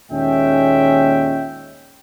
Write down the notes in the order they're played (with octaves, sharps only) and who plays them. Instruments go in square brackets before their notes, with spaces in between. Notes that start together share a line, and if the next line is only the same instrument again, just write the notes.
[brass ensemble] D#2 A#2 G#3 C#4 E5 G5